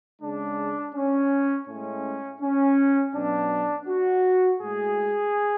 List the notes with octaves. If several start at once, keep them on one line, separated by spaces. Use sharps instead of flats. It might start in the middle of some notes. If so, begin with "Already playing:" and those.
C#3 G#3 D4
C#4
A2 G#3 C#4
C#4
B2 F#3 D4
F#4
A2 G#3 G#4